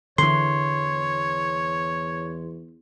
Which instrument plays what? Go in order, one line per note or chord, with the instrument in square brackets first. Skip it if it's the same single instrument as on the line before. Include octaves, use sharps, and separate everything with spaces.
[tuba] E2 [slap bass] D3 E3 [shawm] C#5 [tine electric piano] C6